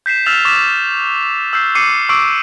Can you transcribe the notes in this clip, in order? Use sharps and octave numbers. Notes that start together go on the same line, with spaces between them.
G6 B6 C7 E7
E6 F6 A6 B6 E7 F7
C#6 D6 A6 B6 E7
E6 F6 G6 C7
D6 C7 C#7 D#7
C#6 D6 E6 C7 D7